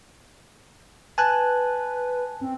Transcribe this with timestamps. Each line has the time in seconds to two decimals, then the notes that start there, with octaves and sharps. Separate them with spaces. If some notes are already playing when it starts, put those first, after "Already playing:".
1.18 B4 G#5 A5 F#6
2.41 C4